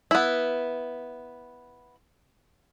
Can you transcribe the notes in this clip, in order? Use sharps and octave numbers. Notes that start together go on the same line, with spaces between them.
B3 E4